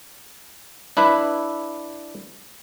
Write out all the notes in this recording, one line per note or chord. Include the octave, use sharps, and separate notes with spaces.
D4 E4 B4 E5